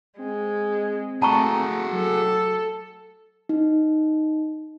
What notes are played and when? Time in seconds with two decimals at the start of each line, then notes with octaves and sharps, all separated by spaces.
0.19 G#3 C4
1.22 A3 F#4 G#4 A5 A#5 C#6
1.93 F#3 A4
3.49 D#4